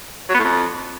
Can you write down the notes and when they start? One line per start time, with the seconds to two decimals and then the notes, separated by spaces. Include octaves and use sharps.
0.29 F#3
0.34 B3
0.39 A2
0.44 F2